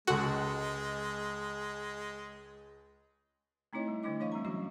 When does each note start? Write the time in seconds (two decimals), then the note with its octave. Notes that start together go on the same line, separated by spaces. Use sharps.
0.07 C#2 G#3 F#4 A4
3.73 A3 C4 D#4 E4 C#5 D#5
3.88 G3
4.03 D3 A3 D4 E4 D#5 D6
4.20 E3 D4 C#5 D#5 F5 C#6
4.32 G3 C4 A#5
4.45 E3 F#3 C#4 F#4 C#6 D6